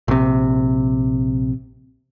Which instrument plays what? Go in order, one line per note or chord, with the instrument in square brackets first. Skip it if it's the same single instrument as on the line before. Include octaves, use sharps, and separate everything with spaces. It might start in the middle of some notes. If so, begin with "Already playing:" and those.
[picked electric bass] A#1 C3